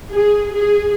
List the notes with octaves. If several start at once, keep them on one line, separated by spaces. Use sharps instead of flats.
G#4
G#4